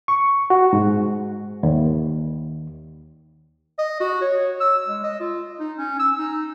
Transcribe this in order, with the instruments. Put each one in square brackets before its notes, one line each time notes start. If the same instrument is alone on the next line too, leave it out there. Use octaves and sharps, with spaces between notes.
[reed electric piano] C#6
F#4
G#2
D#2
[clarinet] D#5
F#4
C#5
E6
G#3
D#5
F4
D#4
C#4
E6
D#4